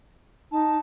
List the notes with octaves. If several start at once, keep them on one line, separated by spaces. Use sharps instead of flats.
D#4 A5